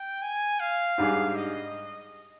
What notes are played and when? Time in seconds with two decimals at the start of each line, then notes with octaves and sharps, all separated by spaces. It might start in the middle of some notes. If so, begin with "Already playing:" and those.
Already playing: G5
0.22 G#5
0.60 F5
0.98 G#2 G3 D4 G#4
1.35 D#5